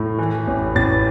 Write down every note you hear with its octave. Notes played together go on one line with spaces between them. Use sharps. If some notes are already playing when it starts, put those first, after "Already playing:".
Already playing: A2
E3
A1
A1 A6